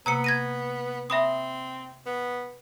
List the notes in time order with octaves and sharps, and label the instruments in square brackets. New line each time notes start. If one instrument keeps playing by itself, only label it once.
[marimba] C3 A#3 [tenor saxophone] B3 [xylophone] A#5 E6 C#7
[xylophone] G#6 A#6 D#7
[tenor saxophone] C4 [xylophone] E5 B5 D#6
[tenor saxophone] B3